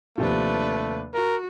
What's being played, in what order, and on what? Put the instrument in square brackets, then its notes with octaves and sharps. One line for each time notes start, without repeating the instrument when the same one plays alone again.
[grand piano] D#2 C3 F3 [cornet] A3 [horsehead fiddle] D4 B4
[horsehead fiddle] F#4 [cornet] A#4